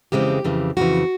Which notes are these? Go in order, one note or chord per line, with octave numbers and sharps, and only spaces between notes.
F2 C#3 E3 G#3 C4 G4
F2 C#3 E3
F2 C#3 E3 F#4